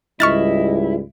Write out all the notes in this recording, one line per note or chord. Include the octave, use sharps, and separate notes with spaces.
C#2 G#2 G3 E4 D#5 C#6 F6 A6